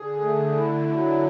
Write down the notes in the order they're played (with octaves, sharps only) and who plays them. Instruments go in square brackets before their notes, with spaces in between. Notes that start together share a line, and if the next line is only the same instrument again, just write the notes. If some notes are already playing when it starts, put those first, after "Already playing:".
Already playing: [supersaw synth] D3 [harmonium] G#4
[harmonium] A3
E4
F#3